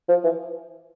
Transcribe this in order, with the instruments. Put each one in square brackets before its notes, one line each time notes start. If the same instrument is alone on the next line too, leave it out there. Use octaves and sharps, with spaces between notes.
[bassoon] F3
E3